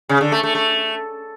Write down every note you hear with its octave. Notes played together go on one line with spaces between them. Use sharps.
C#3
D3
A3
A3
A3